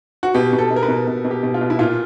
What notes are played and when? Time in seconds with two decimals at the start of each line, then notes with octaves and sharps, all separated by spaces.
0.23 F#4
0.34 B2 G4
0.53 B2
0.58 A4
0.71 B2
0.76 A#4
0.83 B4
0.88 B2
1.07 B2
1.25 B2
1.31 G4
1.43 B2
1.54 F4
1.61 B2
1.70 E4
1.79 A#2 F4